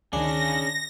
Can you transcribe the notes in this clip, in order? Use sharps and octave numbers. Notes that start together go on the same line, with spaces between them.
D2 D#3 C#4 D4 G#4 A#6